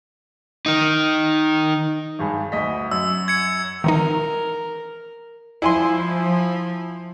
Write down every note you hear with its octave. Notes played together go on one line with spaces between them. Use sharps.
D#3 D#4
G#1 G2 G#4
D2 D#5 B6
F#2 E6
G#6 C#7
D#3 E3 D#4 A#4
F3 E4 G#5 C6